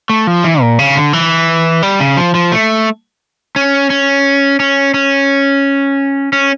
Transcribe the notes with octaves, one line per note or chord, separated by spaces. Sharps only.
A3
F3
E3
A#2
C#3
D3
E3
G3
C#3
F3
F3
A3
C#4
C#4
C#4
C#4
C#4